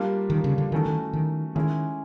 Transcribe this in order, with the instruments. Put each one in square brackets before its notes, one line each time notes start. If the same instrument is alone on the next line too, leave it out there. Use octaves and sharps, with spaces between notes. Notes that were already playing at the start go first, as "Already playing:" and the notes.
Already playing: [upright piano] G3 A#3 D4 F4
[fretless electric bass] D#3
C#3
D3
[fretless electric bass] D#3 [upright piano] E3 A3 C#4 F#4 A4
[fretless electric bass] D#3
D#3
[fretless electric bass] D#3 [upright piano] G#3 C#4 E4